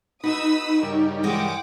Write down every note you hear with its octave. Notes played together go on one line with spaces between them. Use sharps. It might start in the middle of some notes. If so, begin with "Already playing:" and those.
D#4 F#4 B4 B5 D#6 E6
G2 C#3 G3 A#4
E3 G#3 A#4 F#5 G5 D6